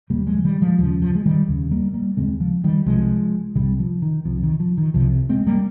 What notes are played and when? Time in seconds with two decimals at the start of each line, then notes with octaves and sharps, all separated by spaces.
0.10 D#2 C#3 G3 A#3
0.27 F3 G#3
0.44 D#3 G3
0.62 F3 G#3
0.79 D#2 C#3 F3
1.02 F3
1.15 G#3
1.26 D#3 G3
1.48 D#2 C#3
1.71 G3 A#3
1.94 G3 A#3
2.17 D#2 C#3 G#3 C4
2.40 F3
2.64 D#3 G3
2.86 C2 C3 F3 G#3
3.55 C2 C3 D#3 G3
3.79 F3
4.02 D#3
4.25 C2 C3 F3
4.43 D#3
4.60 F3
4.77 D#3
4.94 C2 C3 F3
5.29 G#3 C4
5.47 G3 A#3